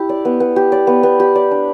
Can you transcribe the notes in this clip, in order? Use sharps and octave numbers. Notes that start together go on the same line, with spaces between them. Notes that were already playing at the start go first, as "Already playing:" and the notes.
Already playing: E4 G4
D5
B3
B3
G4
D5
B3
B3
G4
D5
D4